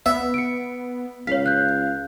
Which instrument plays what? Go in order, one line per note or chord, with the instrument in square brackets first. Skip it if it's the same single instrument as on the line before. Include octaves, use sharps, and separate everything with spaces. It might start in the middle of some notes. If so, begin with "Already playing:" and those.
[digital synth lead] B3 [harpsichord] E5
[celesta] C#7 D7
[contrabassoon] C#2 [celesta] C#5 B6 [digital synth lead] F5
[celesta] F#6 G6